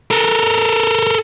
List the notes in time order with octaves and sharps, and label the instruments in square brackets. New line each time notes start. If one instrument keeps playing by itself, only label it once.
[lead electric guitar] A4 A#4